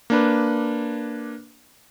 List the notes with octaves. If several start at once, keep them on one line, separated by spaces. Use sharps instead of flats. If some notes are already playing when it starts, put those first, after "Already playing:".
A#3 D4 B4